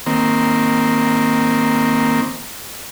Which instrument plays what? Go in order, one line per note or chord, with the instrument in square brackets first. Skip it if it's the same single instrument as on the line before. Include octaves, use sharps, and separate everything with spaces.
[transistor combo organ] D#3 A#3 C4